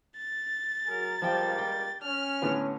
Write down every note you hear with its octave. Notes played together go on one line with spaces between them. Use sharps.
A6
F#3 G#4 A#4
C#2 F3 G3 A#3 G5
G5
C#4 F6
A2 D3 B3